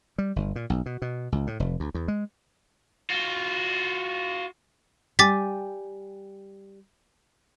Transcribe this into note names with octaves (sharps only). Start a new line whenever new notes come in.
G3
G1
A#2
B1
B2
B2
C#2
A2
F1
D2
E2
G#3
F4 F#4
G3 G5 G#5 D6 A6 B6